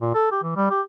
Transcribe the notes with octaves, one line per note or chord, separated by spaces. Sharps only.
A#2
A4
G4
E3
G3
G4